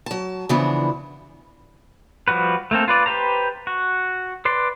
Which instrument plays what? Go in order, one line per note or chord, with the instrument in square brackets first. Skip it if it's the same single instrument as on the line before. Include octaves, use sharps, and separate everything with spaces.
[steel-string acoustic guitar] F#3 A5
C#3 E3 F3 B3 D4
[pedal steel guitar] F3 G3 F#4 B4
A3 A#3 C4 A4
F4 B4 D5
G4 B4 C5 A#5
F#4
B4 D5 C6